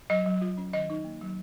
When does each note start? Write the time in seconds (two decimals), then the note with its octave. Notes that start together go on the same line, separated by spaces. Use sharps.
0.10 F#3 D#5
0.26 F#3
0.41 F4
0.57 C#4
0.73 D#3 D#5
0.90 D#4
1.04 A#3
1.21 F#3